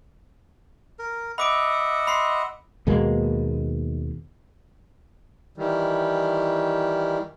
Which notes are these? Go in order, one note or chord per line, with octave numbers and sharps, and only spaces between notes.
A#4
D#5 E5 F#5 B5 D6 D7
B5 C6 C7
D#2 B2 G#3 A#3
D#3 E3 G3